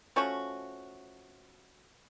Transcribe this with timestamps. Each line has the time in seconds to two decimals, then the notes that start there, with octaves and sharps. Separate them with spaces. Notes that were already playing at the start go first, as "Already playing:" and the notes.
0.16 F3 A3 C#4 F#4